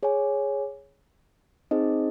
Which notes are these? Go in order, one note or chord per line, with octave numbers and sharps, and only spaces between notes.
G#4 C#5 G#5
C4 D#4 G#4 C5 D#5